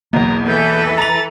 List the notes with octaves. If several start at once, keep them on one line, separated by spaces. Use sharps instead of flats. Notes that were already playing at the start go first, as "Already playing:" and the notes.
B1 E2 A#3 A#5
E3 A4 B4 G6
A#5 A6 F7